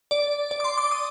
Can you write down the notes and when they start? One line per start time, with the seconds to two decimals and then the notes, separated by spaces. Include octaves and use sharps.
0.11 D5
0.51 D5
0.60 D6
0.64 C6
0.78 D6
0.91 D#6